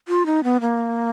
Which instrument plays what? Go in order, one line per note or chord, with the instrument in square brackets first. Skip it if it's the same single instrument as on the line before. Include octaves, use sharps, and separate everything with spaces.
[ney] F4
D#4
B3
A#3